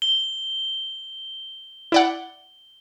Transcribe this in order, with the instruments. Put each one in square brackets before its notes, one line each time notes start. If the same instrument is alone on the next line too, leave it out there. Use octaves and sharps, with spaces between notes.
[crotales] G7
[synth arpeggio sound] E4 D5 F#5